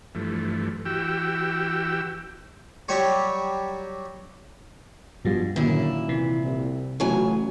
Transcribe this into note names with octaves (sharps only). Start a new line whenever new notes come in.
G2 E3 F3 A3
E3 F#4 G4 G5 E6
F#3 G3 G4 C#5
G2 B2 F3 G3 F4
F#2 A#2 D3 D#3 E4
C3 E3
C2
A1 C#3 F#3 E4 F4 G#5